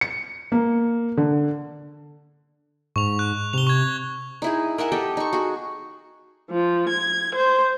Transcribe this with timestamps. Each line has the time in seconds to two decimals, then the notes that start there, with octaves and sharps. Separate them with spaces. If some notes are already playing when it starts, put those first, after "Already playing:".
0.01 C#7
0.52 A#3
1.17 D3
2.96 G#2 C#6 F7
3.19 F#6
3.53 C3 F7 G7
3.67 C#6 G#6
4.42 D#4 E4 G#4
4.78 A#4 E5 F#5 G#5
4.92 G4 A4 D#5 G5
5.17 D#4 C#6
5.33 F#4 G#4
6.50 F3
6.90 G#6
7.35 C5